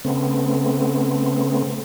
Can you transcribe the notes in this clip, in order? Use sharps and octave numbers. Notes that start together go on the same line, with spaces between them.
C#3 A3 B3 C4